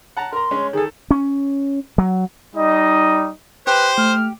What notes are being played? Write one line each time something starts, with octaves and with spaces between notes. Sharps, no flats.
F#5 A5 A#5
A#4 A#5 C6
G#3 C#4
D#3 G#4 A4
C#4
F#3
G3 D#4 D#5
G4 B4 C5
A3 F6